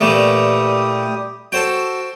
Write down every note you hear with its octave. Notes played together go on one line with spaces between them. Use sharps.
A#2 E3 G3 A3 G4 D#6
F#4 A4 C5 G5